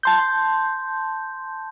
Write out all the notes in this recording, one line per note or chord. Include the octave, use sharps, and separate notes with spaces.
A5 C6 G6